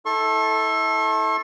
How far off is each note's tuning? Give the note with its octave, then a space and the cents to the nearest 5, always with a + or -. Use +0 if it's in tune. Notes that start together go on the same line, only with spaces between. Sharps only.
E4 -35 A4 +0 C#6 -45